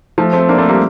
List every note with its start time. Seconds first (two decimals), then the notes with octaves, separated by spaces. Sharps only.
0.18 F3 A3
0.33 A3 C4
0.49 A#3 D4
0.58 A3 C4
0.69 G3 A#3